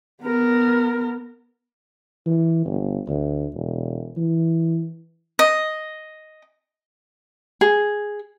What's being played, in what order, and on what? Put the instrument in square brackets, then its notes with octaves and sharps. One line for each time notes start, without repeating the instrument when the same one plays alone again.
[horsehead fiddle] B3 A#4
[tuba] E3
G1
D2
E1
E3
[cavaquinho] D#5
[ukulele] G#4